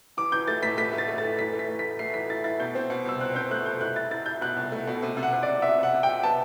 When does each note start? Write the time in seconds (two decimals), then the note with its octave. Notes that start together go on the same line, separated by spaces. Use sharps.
0.17 E3 D6
0.32 E3 G6
0.47 A3 A6
0.63 A2 B6
0.77 A3 B6
0.93 A3
0.98 A6
1.08 A3
1.18 A6
1.23 E3
1.39 E3 B6
1.53 A3
1.59 B6
1.69 A3
1.79 E4 B6
1.99 A3 C7
2.14 E3 B6
2.30 E4 A6
2.44 E4 A6
2.59 B2 G6
2.75 C4
2.90 B2
3.05 C2 E6
3.21 C4 F#6
3.35 C4 G6
3.51 A3 F#6
3.66 C2 G6
3.81 E4 F#6
3.96 E4 A6
4.11 E4 A6
4.26 E4 G6
4.41 B2 F#6
4.56 C2
4.72 A3
4.87 B2
5.02 C3
5.17 C3
5.23 F#5
5.32 C3
5.43 C3 D5
5.62 C3 E5
5.78 C3
5.83 F#5
5.93 C3
6.03 G5
6.08 C3
6.23 B3 A5